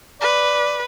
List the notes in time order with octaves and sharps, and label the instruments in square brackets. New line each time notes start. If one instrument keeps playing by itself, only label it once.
[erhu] B4 [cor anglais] D5